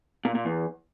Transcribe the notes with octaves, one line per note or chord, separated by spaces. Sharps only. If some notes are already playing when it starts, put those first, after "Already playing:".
A#2
A#2
E2